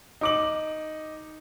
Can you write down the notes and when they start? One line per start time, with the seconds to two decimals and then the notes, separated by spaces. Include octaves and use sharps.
0.21 D#4 D6 F#7